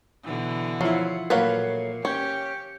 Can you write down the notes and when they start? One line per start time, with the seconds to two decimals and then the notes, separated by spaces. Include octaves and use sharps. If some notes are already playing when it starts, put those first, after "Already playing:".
0.24 B2 D3 E3
0.81 F3 F#3 E4 F4 C7 C#7
1.30 A#2 F#3 A3 A#3 B4 F5
2.05 C#4 G4 G6 C#7